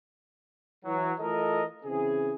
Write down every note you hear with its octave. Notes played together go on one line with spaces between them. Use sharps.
E3 F#3
E3 A3 F4 A4 A#4 D#5
C#3 E3 C4 G#4